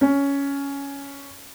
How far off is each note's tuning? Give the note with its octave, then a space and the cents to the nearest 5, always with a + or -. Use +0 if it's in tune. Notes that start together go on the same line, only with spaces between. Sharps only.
C#4 +10